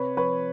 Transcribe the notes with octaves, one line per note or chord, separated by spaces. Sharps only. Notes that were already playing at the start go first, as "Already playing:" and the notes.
Already playing: C3 B4 C#5
F3 B4 C#5